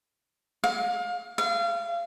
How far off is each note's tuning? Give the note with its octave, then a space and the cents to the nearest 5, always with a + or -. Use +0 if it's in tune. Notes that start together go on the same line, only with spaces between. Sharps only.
F5 +30
F5 -30